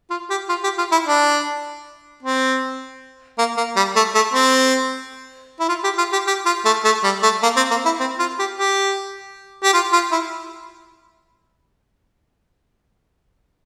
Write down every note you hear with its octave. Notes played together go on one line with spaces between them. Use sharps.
F4
G4
F4
G4
F4
E4
D4
C4
A#3
A#3
G3
A3
A3
C4
E4
F4
G4
F4
G4
G4
F4
A3
A3
G3
A3
A#3
C4
A#3
E4
C4
F4
G4
G4
G4
F4
F4
E4